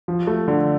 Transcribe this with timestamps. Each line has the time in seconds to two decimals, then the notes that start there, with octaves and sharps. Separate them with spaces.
0.08 F3
0.27 A3
0.48 D3